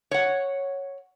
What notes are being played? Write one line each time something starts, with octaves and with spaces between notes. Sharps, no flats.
C#5 F#5